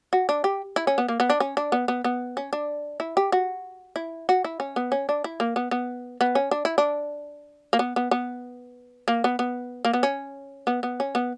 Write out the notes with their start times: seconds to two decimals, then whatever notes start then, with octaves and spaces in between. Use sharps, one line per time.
0.13 F#4
0.29 D4
0.44 G4
0.76 E4
0.87 C#4
0.98 B3
1.08 A#3
1.20 B3
1.30 D4
1.40 C#4
1.57 D4
1.72 B3
1.88 B3
2.04 B3
2.37 C#4
2.53 D4
3.00 E4
3.17 G4
3.32 F#4
3.96 E4
4.29 F#4
4.44 E4
4.60 C#4
4.76 B3
4.92 C#4
5.09 D4
5.24 E4
5.40 A#3
5.56 B3
5.71 B3
6.21 B3
6.35 C#4
6.51 D4
6.65 E4
6.78 D4
7.73 A#3
7.79 B3
7.96 B3
8.11 B3
9.08 A#3
9.24 B3
9.39 B3
9.85 A#3
9.93 B3
10.03 C#4
10.67 B3
10.83 B3
11.00 C#4
11.15 B3